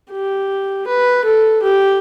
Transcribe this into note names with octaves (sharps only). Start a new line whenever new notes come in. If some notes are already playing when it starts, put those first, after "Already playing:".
G4
B4
A4
G4